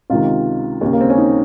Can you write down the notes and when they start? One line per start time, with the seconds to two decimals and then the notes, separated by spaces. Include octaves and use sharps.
0.10 C#2 C3 D#3 F4
0.81 D#2 C#3
0.93 A#3
1.01 C4
1.10 C#4
1.18 D#4